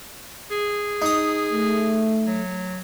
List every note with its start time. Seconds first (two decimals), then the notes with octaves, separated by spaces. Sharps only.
0.51 G#4
1.02 D#4 D#6
1.52 A3
2.27 F#3